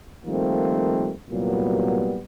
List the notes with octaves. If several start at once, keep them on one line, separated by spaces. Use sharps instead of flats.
D#3 F3 G3 A3 A#3 C4
C2 A#2 F#3 G3 B3